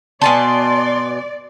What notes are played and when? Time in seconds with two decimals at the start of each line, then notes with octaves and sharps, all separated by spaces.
0.21 B2 D5 G#5 A5 C6